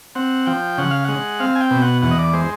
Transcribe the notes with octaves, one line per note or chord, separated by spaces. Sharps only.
C4 F#5
F3 G5
C#3 F#5
F5
G#3 F#5
C4 F5
G#5
G5
B2
F#5
E2 F#5
D#5
D5
G#3 C5